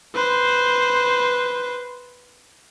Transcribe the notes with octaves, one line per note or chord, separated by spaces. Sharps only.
B4 C5